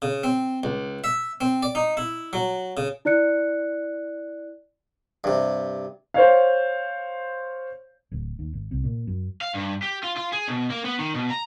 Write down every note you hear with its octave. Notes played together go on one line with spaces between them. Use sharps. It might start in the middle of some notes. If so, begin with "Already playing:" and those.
C#3
C4
C#2
E5
C4
D5
D#4
E4
F#3
C#3
E4 D5 F#6 C#7
G2 C3
C5 C#5 F5
D1
D#2
G#1
C2
A#2
F#2
F5
G2
G4
F4
F4
G#4
B2
A#3
B3
D#3
B2
A#5